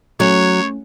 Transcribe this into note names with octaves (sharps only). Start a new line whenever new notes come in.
F#3 A3 C#4 C#5